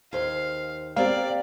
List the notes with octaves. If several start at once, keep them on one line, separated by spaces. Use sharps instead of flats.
D#2 C5 F5
A#3 C4 G4 D5 F5